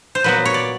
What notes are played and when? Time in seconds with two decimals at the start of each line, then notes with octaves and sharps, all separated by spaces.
0.15 C5
0.24 A#2 F#3 B3 B4
0.45 C#5
0.54 D5